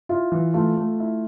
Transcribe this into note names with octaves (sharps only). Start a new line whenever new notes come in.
E4 F4
E3
A3 F4
A3
E4